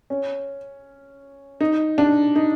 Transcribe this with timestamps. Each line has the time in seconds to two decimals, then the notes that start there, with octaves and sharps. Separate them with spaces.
0.10 C#4
1.61 D#4
1.98 D4
2.36 D#4